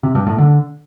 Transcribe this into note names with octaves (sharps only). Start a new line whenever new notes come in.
C3
G2
A2
D3